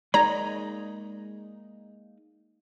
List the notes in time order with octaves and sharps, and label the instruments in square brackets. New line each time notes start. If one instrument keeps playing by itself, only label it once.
[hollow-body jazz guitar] G#3 A#3 D#4 [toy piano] D5 [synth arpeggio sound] A#5